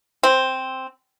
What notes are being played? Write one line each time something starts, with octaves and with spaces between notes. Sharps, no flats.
C4